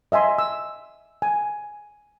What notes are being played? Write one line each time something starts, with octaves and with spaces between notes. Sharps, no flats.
D#5 E5 G#5 C6
E6
G#5